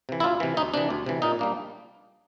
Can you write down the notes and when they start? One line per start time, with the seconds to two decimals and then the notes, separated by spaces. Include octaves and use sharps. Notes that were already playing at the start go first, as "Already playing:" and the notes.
0.09 C3 E3
0.20 E4
0.24 D2 F4
0.40 C3 E3
0.57 D2 D#4
0.74 C3 E3 D4
0.90 D2
1.06 C3 E3
1.22 A#2 D#4
1.39 G3 A#3 D4